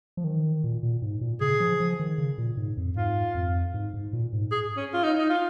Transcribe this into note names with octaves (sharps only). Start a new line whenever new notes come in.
F3
D#3
A#2
A#2
G#2
A#2
C#3 G#4
F3
F3
D#3
C#3
A#2
G#2
F2
G#2 F4
F2
G#2
G#2
A#2
G#2
G#4
C#4
F4
D#4
D#4
F4